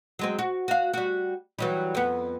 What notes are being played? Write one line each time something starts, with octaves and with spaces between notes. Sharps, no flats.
F#3 G#3 C4
F#4
F#4 F5
G3 F#4
E3 F#3 G3
F2 B3